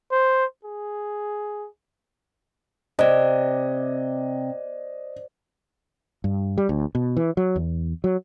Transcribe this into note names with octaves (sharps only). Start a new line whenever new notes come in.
C5
G#4
C3 C5 D5 D#5
G2
G3
D2
B2
E3
F#3
E2
F#3